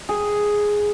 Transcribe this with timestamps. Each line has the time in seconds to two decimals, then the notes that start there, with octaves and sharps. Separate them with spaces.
0.09 G#4